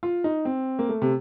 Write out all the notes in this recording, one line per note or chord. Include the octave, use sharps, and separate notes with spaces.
F4
D#4
C4
A#3
A3
C3